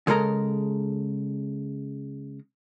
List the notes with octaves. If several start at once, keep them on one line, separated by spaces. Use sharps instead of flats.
C#3 G#3 A4 A#4 A#5